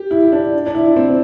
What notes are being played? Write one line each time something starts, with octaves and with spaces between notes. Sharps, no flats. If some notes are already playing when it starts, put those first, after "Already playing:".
Already playing: G4
E4
D4
D4
E4
C4